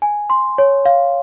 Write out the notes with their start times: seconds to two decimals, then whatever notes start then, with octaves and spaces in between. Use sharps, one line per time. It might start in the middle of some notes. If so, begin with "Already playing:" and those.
0.02 G#5
0.30 C6
0.58 C#5
0.86 F5